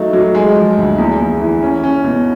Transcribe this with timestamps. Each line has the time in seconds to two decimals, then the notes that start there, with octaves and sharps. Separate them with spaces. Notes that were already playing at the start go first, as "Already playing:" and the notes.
Already playing: F#3 A3 D#4
0.13 F#3
0.35 G#3
0.55 F3
0.77 D2
0.98 E2
1.19 E2
1.41 E3
1.63 C#4
1.84 C#4
2.04 B2